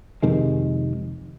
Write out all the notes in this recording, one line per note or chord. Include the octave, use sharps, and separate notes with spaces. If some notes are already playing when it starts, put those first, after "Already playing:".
F2 C3 D#3 G#3